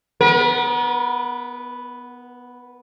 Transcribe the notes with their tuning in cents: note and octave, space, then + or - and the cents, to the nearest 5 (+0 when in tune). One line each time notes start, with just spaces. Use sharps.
B3 +0 A#4 +45